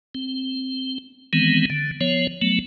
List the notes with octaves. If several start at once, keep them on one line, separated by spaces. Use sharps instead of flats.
C4
D#3 E3 G#3 B3 C4
D3
F3 B3 C#5
F#3 A3 B3